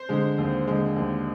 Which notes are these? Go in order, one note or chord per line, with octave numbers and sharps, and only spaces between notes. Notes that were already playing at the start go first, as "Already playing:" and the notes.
Already playing: C5
D3 G#3
D#2
D3 G#3
D#2